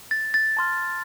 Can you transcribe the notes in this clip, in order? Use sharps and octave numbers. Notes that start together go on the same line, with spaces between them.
A6
A6
A5 C6 F6